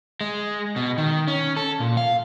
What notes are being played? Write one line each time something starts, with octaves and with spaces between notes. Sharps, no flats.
G#3
B2
D#3
C#4
A4
A#2
F5